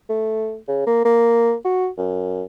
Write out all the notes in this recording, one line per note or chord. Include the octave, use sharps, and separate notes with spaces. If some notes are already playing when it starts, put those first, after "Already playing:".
A3
C#3
A#3
A#3
F#4
F#2